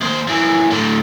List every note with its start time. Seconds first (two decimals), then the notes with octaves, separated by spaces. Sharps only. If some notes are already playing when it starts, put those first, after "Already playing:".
0.01 D#2 C5
0.27 F#2 E3
0.70 A2 D3